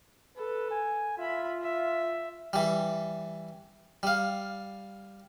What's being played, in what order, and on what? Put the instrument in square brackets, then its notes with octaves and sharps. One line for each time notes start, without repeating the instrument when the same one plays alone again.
[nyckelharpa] A4 [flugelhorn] B4
[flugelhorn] G#5
[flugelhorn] F4 [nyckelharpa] E5 B5
[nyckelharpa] E5
[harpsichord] E3 G3
G3 F5